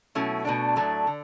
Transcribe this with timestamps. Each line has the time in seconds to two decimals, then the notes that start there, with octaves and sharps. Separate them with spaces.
0.15 B2 F#3 A3 C#4 E4
0.45 B2 A3 D4
0.76 A2 F#3 A3 D4
1.07 D3